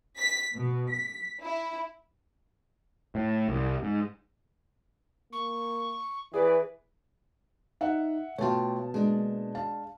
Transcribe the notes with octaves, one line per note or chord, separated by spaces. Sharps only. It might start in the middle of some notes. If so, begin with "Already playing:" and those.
B6
B2
B6
E4
A2
C2
G#2
A#3 C#6
E3 G#4 B4 D5
D#4 E5 F#5
B2 A3 F4 C#5 G5 A5
G#3 A#3 D4
F5 A5